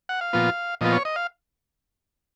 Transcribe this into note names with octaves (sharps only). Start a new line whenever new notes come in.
F#5
F5
A#2 F3 B3 F4
A#2 F3 B3 F4 D#5
C#5
D#5
F5